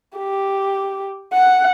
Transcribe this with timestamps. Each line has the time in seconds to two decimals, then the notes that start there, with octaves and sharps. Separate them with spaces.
0.17 G4
1.33 F#5